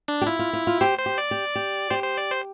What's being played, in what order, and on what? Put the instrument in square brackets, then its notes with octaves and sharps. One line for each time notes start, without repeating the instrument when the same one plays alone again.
[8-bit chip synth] D4
[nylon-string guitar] G4
[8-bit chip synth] E4 [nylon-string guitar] F4
[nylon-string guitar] F4
F4
F4
[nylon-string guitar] G4 [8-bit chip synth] C5
[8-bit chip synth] C5
[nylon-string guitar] G4
[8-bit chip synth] D5
[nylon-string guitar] G4
G4
[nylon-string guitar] G4 [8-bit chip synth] C5
[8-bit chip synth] C5
D5
C5